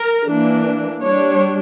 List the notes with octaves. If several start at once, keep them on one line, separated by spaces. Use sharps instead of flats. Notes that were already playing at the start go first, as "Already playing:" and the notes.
Already playing: A#4
E3 A#3 D4
G3 D4 C#5